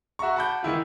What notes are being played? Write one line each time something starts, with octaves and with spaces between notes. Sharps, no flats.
F#4 E5 F#5 A#5 C#6
F#5 A5 B5 D6 G6
D#3 E3 E4 F4